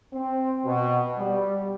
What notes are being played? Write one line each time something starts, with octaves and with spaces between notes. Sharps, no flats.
C4
B2
G3